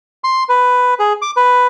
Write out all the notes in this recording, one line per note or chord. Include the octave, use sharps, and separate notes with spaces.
C6
B4
G#4
D6
B4